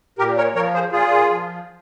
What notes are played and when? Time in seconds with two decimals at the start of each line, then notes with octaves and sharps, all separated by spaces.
0.18 A#2 G4 A#4
0.37 A#4 C#5
0.55 F3 A#4 C#5
0.74 G#4 C5
0.92 A#2 F4 G#4
1.30 F3